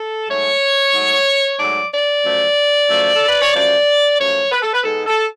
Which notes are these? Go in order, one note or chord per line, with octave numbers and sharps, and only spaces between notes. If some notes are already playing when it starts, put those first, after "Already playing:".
Already playing: A4
G#2 F#3 A3 C#5
G#2 F#3 A3
G#2 F#3 A3 D5
D5
F#2 F3 A3
F#2 F3 A3
A4
B4
C#5
F#2 F3 A3 D5
F#2 F3 A3 C#5
B4
A4
B4
G#2 G#3 B3 A4
A4